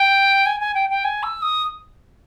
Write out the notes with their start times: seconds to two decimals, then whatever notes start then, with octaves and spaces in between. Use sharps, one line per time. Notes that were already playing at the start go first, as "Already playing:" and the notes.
Already playing: G5
0.46 G#5
0.60 G#5
0.74 G5
0.90 G5
1.04 G#5
1.23 E6
1.42 D#6